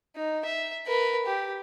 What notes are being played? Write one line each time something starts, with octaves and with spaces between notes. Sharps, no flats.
D#4
E5
A#4 B4
G4